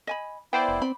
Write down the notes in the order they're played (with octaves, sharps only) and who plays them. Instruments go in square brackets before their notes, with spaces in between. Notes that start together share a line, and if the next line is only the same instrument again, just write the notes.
[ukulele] D#5 G#5 B5
[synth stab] B3 C5 D5 [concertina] E4 [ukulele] G5
[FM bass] F1
[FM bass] C4 [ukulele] B5